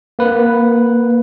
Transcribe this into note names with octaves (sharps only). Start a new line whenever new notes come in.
A#3 B4